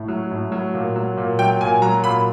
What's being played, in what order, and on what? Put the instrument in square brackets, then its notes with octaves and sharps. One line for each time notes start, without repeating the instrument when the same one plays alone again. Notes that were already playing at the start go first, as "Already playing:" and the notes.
Already playing: [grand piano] A2
F#3
A2
F#3
A#2
F#3
A#2
F#3 G5
A#2 G#5
F#3 A#5
A#2 B5